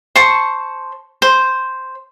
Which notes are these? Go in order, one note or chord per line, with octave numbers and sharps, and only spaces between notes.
C5 A5 C#6
C5